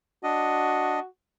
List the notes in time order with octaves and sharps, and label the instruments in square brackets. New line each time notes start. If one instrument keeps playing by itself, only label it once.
[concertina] D4 D#5 [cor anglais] F#4